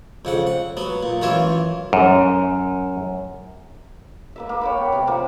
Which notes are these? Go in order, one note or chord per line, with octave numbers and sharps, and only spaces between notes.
F2 C#3 F#5
F#5
F#3 B3
A#2
F#2 E3 F4 C#5 E5
F#2
A#3 B4 E5
A#3
C#5 G5 B5
B3
C3 C4
F3 A#3 G5